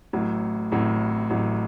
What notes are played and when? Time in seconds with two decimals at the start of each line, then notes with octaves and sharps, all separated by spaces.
0.13 A1 A2 F#3
0.72 A1 A2 F#3
1.30 A1 A2 F#3